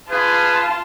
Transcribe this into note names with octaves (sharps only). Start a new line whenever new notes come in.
F4 G#4 B4 A5